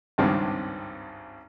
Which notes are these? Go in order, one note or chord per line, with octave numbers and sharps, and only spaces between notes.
G#1 C#2 G2 D#3 C4 D4